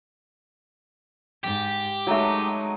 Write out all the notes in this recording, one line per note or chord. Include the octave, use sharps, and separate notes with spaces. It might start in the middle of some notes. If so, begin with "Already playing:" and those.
G#2 G4
F#3 G#3 A3 D#4